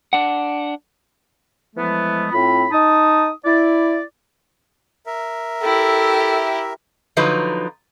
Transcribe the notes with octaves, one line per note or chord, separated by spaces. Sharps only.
D4 F#5
E3 F3 G#3 A3 B3
A2 C4 F4 B5
D#4 A5 D#6
E4 D5
A#4 E5
E4 G4 A4
D3 F3 F#3 D#4 B4